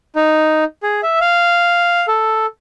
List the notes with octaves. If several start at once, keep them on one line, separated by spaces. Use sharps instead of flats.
D#4
G#4
E5
F5
A4